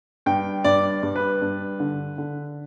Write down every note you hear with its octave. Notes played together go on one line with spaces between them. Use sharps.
G2 G5
G2 D5
G2
B4
G2
D3
D3